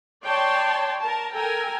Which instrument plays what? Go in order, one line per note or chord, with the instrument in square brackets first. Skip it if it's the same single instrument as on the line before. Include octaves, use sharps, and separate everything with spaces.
[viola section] C#5 D5 G5 A5 C6
A#4 A5
A4 A#4 G5 G#5